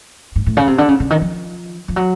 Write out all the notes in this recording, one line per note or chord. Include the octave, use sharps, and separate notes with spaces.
G#2
A2
C#3
C3
D3
C#3
C#3
D#3
F3
F3
F#3